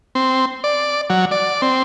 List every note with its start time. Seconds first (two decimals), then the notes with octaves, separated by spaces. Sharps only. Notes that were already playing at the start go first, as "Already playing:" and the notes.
0.15 C4
0.64 D5
1.10 F#3
1.31 D5
1.62 C4